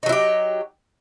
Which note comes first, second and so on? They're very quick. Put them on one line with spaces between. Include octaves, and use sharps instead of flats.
D#4 F#3 E4 G4